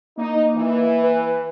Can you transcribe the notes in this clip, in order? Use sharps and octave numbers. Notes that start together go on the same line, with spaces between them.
A#3 D#4
E3
B4